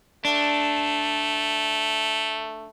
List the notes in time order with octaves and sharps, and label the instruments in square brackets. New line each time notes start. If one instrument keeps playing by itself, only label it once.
[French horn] A3 [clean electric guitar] D4